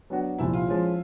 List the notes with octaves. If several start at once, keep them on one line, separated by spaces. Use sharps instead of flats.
F#3 B3 D4 F#4
C2 A#2 F3 E4
F4
F3 G#3 C#4